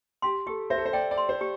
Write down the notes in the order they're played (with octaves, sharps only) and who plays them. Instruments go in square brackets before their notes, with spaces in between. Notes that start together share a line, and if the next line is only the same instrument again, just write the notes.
[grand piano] G4 [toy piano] C6
[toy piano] G4 [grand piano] A4
[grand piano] C5 [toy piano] E5
[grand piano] A4
C5
[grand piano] D5 [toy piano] G5
[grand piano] D5
[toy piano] C6
[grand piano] C5
[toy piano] G4